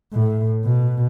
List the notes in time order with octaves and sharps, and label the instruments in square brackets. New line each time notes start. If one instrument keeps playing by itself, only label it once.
[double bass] A2
B2